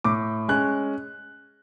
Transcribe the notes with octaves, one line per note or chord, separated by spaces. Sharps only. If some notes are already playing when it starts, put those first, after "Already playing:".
A2 D6
G#3 C#4 F#6